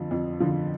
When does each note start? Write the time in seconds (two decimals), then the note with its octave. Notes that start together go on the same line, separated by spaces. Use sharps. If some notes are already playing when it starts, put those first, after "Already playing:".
Already playing: F2 D3 F3
0.11 F2
0.40 D3 F3